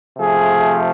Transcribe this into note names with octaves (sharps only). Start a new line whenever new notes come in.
C3 F3 A3 G#4